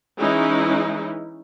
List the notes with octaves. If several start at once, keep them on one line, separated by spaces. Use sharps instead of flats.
E3 G#3 C#4 D#4 E4